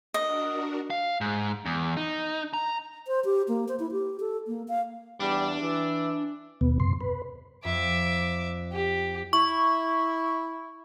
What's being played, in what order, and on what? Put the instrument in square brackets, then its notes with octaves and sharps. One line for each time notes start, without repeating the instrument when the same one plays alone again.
[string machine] D4 F#4 A#4 [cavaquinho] D#5
[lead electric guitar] F5
G#2
E2
D#4
A#5
[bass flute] C5
G4
A#3
C5
E4
G4
A4
A#3
F5
[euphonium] E2 [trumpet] G3 [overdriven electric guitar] D4
[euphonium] E3 [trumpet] E5
[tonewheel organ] D#2 B2 B3
F#2 C3 C6
B4
[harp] F2 [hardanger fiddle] E5 D6
[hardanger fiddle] G4
[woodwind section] E4 [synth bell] C#6